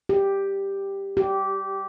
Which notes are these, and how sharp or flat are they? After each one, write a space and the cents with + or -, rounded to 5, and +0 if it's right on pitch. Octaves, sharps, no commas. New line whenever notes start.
G4 +5
G4 -15